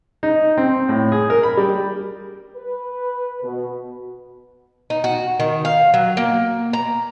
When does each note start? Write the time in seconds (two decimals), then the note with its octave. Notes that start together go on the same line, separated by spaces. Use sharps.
0.23 D#4
0.57 C4
0.89 A2
1.12 G#4
1.30 A#4
1.43 B5
1.57 G3
2.57 B4
3.43 B2
4.90 D#4
5.04 F#4
5.40 D#3
5.65 F5
5.94 F#3
6.17 A#3
6.73 A#5